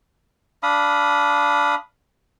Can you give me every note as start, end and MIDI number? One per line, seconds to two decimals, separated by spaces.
0.63 1.75 62
0.63 1.75 77
0.63 1.75 83
0.63 1.75 87